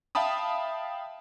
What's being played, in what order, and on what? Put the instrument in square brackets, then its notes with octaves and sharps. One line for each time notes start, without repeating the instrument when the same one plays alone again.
[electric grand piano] E5 F5 G5 A5 B5 D#6